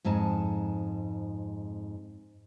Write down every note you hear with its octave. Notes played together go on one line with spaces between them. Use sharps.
F2 G#2 C4 G#5 A5